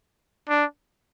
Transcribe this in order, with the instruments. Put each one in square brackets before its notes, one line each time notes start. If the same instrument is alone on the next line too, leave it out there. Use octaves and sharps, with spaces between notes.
[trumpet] D4